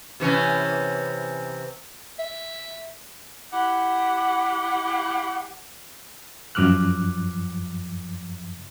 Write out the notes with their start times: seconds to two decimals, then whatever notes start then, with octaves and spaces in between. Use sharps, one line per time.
0.20 C3 E3 C#4
2.18 E5
3.52 E4 G4 F#5
6.55 F#2 F3 D6 F6 F#6